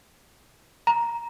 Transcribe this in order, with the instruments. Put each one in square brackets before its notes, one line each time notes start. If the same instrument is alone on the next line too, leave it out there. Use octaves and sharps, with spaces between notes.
[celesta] A#5